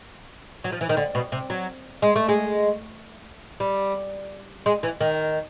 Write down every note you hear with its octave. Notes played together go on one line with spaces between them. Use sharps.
F#3
F3
E3
D#3
D3
B2
C3
F#3
G#3
A3
G#3
G3
G#3
E3
D#3